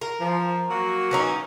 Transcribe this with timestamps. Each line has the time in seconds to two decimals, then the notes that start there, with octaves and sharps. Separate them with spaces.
0.01 A#4
0.20 F3
0.70 F#3 A#3 F#4
1.11 E3 C#4 D#4